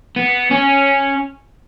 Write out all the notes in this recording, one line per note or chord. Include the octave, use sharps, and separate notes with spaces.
B3
C#4